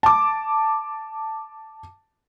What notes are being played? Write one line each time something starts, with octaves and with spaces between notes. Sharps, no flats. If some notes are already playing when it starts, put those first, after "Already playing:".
A5 D6